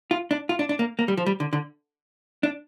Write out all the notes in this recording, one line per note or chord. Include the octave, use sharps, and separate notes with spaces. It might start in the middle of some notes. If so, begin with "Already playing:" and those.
F4
D4
F4
D4
D4
A#3
A#3
G3
F3
G3
D3
D3
D4